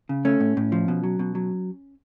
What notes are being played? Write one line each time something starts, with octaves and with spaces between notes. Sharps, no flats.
C#3
A3 C#4
A2
A2
F3
B2
F#3
B2
F#3